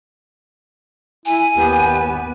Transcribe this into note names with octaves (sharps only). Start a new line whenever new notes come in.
E4 G#5
D#2 B3 G4